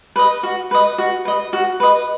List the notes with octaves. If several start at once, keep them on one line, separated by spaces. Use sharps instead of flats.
B4 D#5
F#4
B4 D#5
F#4
B4 D#5
F#4
B4 D#5